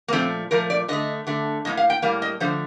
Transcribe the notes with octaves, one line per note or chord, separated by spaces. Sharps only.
A#3
A#2 F3 A3 C4
A#2 F3 A3 A#4
D5
D3 A3 D#5
D3 A3
A2 G3 A#3 D#5
F5
G5
A2 G3 A#3 F5
D#5
D3 F3 A3 C5